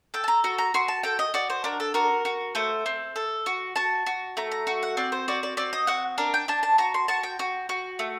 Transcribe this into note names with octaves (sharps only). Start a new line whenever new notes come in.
A4 G5
A5
A#5
F#4 A#5
A#5
F#4 C6
A5
A4 G5
D#5
F#4 D5
C5
D4 A#4
A4
F#4 A#4
F#4
A3 C5
C4
A4
F#4
F#4 A5
F#4
A3 A#5
A#5
F#4
F#5
C4 D5
C5
F#4 D5
D5
C4 D5
D#5
F#4 F#5
D4 A#4
G5
D4 A5
A5
F#4 A#5
C6
F#4 A5
G5
F#4
F#4
A3